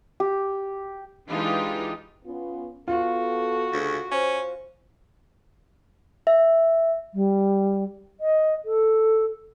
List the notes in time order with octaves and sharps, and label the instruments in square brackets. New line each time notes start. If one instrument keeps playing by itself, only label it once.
[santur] G4
[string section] E3 G#3 D4 D#4 F4 G4
[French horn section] B3 C#4 F4
[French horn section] B3 A4 [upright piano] F4 [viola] F#4
[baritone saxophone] D2 [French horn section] C#3
[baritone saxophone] C#4 [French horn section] C5
[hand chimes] E5
[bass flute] G3
D#5
A4